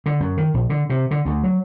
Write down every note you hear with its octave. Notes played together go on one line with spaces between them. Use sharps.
D3
F#2
D#3
A#1
D3
C3
D3
D2
F#3